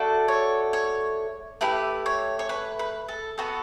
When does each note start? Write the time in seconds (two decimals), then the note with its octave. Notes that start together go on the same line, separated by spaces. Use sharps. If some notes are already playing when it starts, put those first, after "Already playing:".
Already playing: A3 D4 F#4 A4
0.28 C#5
0.73 C#5
1.61 A3 E4 G4 B4
2.06 C#5
2.39 C#5
2.49 B4
2.79 B4
3.08 A4
3.38 B3 F#4 A4 B4